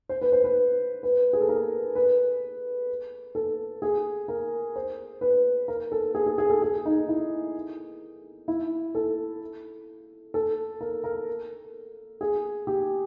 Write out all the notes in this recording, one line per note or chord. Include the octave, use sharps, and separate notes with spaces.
C5
B4
C5
B4
B4
G#4
A4
A#4
B4
A4
G#4
A#4
C5
B4
A#4
A4
G#4
G#4
G#4
A4
G#4
D#4
E4
E4
A4
A4
A#4
A#4
G#4
G4